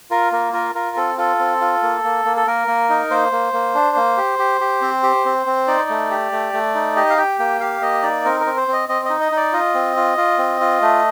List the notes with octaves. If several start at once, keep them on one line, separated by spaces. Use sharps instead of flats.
F4 A#4
A#3 A#4
F4 A#4
F4 A#4
C4 A4
F4 A4
C4
F4
A#3
A#3
A#3
A4
A#3 A#4
A#3
D#4
A#3 C5
A#3
A#3
D4
A#3
G4
G4
G4
C4
G4
C4
C4
D#4 D5
A3
G4
A3
A3
D#4
G4 D#5
F5
G4 G5
A#3 G5
G4 F5
A#3 D#5
D#4 D5
C4 A#4
A#4
C4
C5
C4
D#5
C4 D#5
D#4 D#5
D#5
D#4 D5
F4 D#5
C4
F4
F4
C4
F4
A3